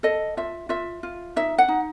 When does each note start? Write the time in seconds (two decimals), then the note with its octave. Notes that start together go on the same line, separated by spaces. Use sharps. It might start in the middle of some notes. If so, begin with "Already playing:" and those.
0.03 A4 D#5
0.37 F4 E5
0.69 F4 E5
1.03 F4
1.36 D#4 E5
1.58 F#5
1.68 D#4